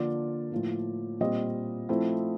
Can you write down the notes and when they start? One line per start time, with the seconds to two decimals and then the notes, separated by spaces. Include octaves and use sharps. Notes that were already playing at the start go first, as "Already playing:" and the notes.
Already playing: D3 F3 A#3 D4 F4 D5
0.52 A2 F3 A#3
1.20 A#2 G3 C4 F4 D#5
1.89 F3 A3 C4 E4